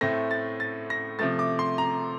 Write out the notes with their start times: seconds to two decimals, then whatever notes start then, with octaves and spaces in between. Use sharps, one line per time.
0.01 A2 A3 C4 A#6
0.31 A6
0.60 A6
0.90 A#6
1.19 C3 F3 A3 A6
1.39 D6
1.59 C6
1.78 A#5